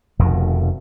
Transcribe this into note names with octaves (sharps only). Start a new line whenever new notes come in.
F1 F2 B2 D#3